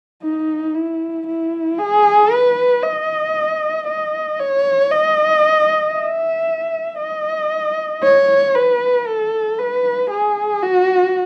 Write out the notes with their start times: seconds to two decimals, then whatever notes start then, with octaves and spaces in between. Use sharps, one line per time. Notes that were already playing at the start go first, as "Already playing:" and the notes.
0.23 D#4
0.75 E4
1.27 E4
1.78 G#4
2.31 B4
2.83 D#5
3.87 D#5
4.39 C#5
4.91 D#5
5.95 E5
6.99 D#5
8.03 C#5
8.55 B4
9.07 A4
9.58 B4
10.10 G#4
10.62 F#4